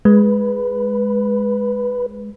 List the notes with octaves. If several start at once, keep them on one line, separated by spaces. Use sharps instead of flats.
G#3 B4